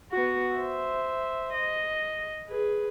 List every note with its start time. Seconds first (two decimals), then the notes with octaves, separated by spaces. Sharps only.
0.12 B3 F#4
0.54 C5 E5
1.53 D#5
2.48 G#4 B4